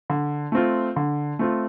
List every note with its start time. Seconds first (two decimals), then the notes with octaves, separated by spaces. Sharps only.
0.10 D3
0.52 A3 C4 F4
0.96 D3
1.39 A3 C4 F4